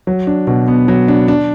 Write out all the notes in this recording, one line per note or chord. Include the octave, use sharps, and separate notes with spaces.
F#3
D4
B2
B3
F#3
D4
D4